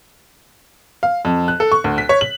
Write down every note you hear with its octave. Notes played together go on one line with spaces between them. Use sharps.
F5
F2
F#6
A4
C#6
D2
B6
C#5
F#7